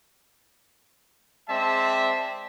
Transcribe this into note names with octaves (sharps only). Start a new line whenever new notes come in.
G#3 C4 D5 E5 A5